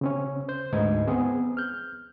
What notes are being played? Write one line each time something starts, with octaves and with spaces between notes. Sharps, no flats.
C#3 C4 C#4
C5 G6
D2 G#2 D#4 B4 D#5 G#6
B3 C4 G#4
F6 G6